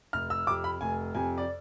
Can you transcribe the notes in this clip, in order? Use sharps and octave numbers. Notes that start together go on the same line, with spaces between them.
F1 F6
E6
F2 C3 D6
B5
F1 G#5
F2 C3 G#5
D5